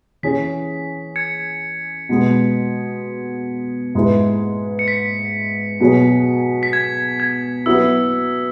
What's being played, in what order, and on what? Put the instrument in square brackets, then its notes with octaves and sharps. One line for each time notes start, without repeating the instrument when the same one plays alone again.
[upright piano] E3 C#4 G#4 [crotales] B6
[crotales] G#6 C#7
[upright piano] B2 G#3 B3
G#2 G#3 E4 B4
[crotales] C#7
B6
[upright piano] B2 F#3 B3 G#4 C#5
[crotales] B6
G#6
G#6
[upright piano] F#3 B3 E4 [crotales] E6